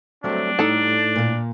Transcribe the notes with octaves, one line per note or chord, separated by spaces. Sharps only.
F#3 G3 A3 C4 D4
A2 D#4 A4 A5
A#2 A#3